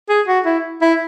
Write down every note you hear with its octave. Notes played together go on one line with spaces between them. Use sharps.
G#4
F#4
E4
E4